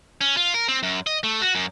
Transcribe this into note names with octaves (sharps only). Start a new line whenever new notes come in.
C#4
F4
A#4
C4
F#2
D#5
A3
F#4
F#2